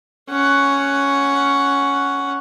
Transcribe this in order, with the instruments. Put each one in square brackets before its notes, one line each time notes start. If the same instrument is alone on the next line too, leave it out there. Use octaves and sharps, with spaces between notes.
[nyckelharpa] C#4 F#5